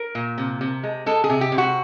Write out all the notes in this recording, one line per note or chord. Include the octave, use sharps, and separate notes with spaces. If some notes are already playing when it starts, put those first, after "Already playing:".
Already playing: A#4
A#2
C3
C3
G#3
G#3 A4
G#4
C3
G4
C3
F#4